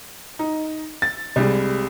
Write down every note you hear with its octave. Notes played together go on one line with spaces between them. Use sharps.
D#4
A6
C2 G3 G#3